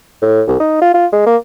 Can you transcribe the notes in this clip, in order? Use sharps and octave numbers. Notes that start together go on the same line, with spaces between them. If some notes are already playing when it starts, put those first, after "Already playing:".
A2
C2
D#4
F4
F4
G#3
A#3